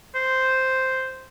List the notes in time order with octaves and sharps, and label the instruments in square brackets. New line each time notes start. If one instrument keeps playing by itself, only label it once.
[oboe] C5